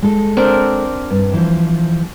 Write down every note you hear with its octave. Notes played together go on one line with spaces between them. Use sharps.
G#3 A4
C4 D4 A#4
G2
E3 F3